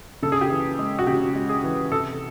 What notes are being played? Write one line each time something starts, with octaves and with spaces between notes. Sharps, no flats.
C#3 A4
G#4
G4
E3 G#4
G#3
F#4
C#3 G4
G#3
G#4
E3
C3 A4